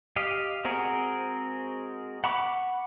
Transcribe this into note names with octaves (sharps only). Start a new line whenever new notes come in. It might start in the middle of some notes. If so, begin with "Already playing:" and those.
G4 D#5 F5
G#3 C4 F#4 G#4 A#4
F#5 B5 C#6 D6